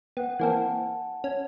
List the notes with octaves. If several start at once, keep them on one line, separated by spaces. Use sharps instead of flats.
B3 F#5 G5
E3 A#3 C4 F#5 G#5 A5
C#4